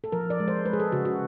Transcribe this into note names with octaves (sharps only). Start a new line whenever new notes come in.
A4
F3 A#4
D5
G#3
C5
G#3 B4
G#4
A4
C#3 F#4
F#4